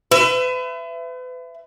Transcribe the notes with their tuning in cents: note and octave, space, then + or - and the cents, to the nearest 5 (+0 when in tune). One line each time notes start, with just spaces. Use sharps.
B4 +40 E5 +25